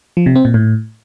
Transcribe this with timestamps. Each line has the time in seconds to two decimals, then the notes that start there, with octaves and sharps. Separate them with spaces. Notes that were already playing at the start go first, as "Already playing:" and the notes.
0.17 F3
0.26 C3
0.36 C4
0.45 A#2
0.54 A2